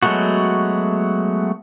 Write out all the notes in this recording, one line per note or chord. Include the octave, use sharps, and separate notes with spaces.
F#3 G#3 A3 B3 F#4